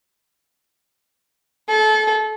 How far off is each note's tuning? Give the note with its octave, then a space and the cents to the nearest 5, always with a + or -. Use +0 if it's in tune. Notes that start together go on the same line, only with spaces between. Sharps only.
A4 -30